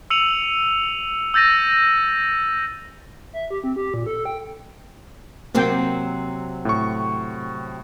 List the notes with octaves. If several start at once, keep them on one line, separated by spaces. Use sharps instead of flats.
E6 C#7 D#7 F7 F#7
E6 G6 A6 A#6 D#7
E5
G4
C4
G4
A#2
A4
G5
C3 F#3 A#3 C4 G5
A2 C#6